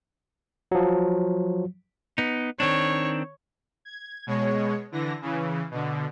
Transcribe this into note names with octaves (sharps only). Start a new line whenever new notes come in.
F3 F#3
B3 D#4
D#3 C4 D4 C#5
G#6
B2 G#3 C#5
D3 E3 A#6
C#3 E3
B2 D3